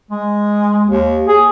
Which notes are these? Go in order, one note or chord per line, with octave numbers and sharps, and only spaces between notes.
G#3
D#2
G#4